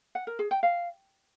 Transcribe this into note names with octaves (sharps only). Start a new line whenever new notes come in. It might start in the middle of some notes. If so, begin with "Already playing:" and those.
F#5
A#4
G#4
G5
F5